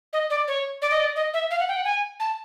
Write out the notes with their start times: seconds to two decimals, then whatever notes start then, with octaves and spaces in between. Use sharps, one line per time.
0.13 D#5
0.30 D5
0.48 C#5
0.82 D5
0.91 D#5
1.00 D5
1.16 D#5
1.34 E5
1.51 F5
1.60 F#5
1.68 G5
1.76 F#5
1.85 G#5
2.20 A5